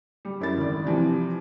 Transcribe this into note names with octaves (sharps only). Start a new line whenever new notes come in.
G3
F#2 E4 A#4 A6
G#1 D5
C3 E3 F3 G3